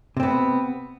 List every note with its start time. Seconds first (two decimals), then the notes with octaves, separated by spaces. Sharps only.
0.17 C3
0.20 C4
0.23 B3